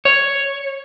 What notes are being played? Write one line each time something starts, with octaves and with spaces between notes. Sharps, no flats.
C#5